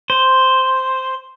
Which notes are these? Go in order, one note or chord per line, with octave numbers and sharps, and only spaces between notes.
C5